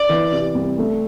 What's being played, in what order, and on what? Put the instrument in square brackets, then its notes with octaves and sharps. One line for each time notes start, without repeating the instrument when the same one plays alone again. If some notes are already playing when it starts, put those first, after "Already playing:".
Already playing: [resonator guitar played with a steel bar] D5
[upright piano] E3
C3
C2
A3